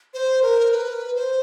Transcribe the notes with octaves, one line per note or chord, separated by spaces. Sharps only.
C5
A#4
B4
C5